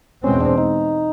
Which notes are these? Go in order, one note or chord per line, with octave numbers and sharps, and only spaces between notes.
E2 B2 G#3 C4 C#4
D4
D#4